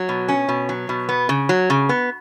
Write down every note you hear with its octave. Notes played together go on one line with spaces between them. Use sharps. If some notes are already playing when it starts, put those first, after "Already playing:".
Already playing: F#3
B2
C#4
B2
F#3
B2
B3
C#3
F#3
C#3
B3